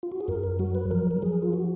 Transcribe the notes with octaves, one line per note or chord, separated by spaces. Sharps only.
F4
F#4
G#4
F#2 A#4
A#4
F#3 F#4
B4
F3 A#4
A#4
F3 G#4
F4
F#4